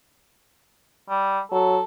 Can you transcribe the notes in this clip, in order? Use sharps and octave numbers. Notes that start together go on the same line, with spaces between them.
G3
F#3 A4